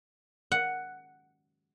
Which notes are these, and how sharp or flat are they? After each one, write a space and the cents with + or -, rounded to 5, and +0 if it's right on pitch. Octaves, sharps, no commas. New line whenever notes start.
F#5 +5